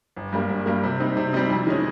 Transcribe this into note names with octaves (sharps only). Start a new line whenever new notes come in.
G1
G2 G3 A#3
G1
G2 G3 A#3
C3
G3 C4 D#4
C3
G3 C4 D#4
F2
D#3 G#3 C#4